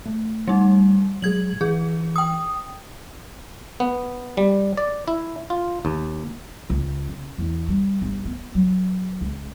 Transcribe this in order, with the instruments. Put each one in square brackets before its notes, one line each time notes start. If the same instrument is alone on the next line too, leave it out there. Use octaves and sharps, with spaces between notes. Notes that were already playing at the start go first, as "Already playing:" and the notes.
[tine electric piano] A3
[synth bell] G3 D#4
[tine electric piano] F#3 G#3 G#4 [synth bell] G#6 F#7
[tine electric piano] E3 [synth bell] G#4
[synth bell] G5 D#6
[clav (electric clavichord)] B3
G3
D5
E4
F4
D#2
[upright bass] C#2
C#3
E2
G3
G1
B3
F#3
C#2